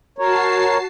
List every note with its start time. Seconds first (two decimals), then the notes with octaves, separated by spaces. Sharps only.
0.18 F#4 A#4 C#5 A5 C7